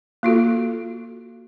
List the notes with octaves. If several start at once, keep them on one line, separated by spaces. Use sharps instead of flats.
A#3 F4 F#4 A4